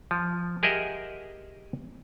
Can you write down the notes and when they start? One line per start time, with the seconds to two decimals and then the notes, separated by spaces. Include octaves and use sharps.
0.11 F3
0.63 G4 G#4 A#4 D#5 E5 F#5